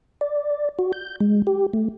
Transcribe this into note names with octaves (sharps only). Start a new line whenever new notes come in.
D5
F#4
G6
G#3
G4
A3